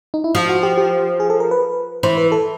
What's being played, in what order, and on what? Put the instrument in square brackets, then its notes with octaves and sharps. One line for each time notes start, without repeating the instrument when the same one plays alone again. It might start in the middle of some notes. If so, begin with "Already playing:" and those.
[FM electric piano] D#4
E4
[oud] F3
[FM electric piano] F#4
G4
G4
G#4
A4
A#4
B4
[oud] E3 [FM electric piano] C5
[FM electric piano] B4
A4